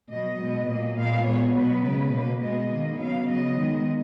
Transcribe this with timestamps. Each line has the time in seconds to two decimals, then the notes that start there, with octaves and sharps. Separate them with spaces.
0.11 B2 F#3 B3 D#5
0.40 B2 G#3 B3
0.68 A#2 F#3 A#3
0.97 A#2 G#3 B3 F5
1.26 A#2 G#3 B3 C#5
1.55 B2 F#3 B3 B4
1.84 C#3 G#3 B3
2.14 B2 A#3
2.42 B2 G#3 B3 D#5
2.71 D#3 A#3
3.00 C#3 F#3 B3 F5
3.29 C#3 F#3 B3 D#5
3.57 D#3 G#3 B3